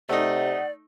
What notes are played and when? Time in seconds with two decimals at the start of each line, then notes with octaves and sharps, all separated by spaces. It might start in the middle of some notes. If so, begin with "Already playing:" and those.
0.09 C3 A3 D#4 D5 F#5